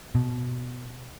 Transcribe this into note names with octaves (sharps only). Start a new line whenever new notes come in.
B2